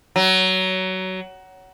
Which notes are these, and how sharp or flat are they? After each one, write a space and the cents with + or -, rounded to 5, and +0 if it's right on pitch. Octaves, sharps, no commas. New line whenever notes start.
F#3 +20